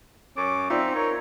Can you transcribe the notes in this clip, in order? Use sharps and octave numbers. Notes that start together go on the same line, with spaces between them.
F#2 C#4 D6
C4 D#4 F4 D5 E5
A#4 C#5